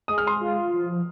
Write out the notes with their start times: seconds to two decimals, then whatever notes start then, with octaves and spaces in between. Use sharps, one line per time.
0.08 G#3 D#6
0.18 F6
0.27 C6 D#6
0.40 F4
0.72 F3